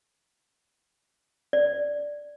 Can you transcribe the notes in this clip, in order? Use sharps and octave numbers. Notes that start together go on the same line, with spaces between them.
D5